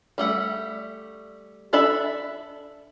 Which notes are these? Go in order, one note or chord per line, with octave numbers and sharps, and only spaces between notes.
G3 A3 F#5
D4 A4 D5 E5 B5